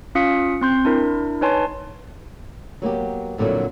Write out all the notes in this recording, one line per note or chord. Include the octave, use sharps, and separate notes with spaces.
C#4 F4 F5 D#6 B6 C#7
C4 C6 G6
D4 E4 A#4
D#4 B4 C#5 G#5 A5 C6
F#3 A#3 B3 G4
F2 A#2 D3 F#3 E4